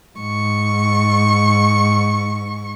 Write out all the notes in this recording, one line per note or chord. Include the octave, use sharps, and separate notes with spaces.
G#2 C#6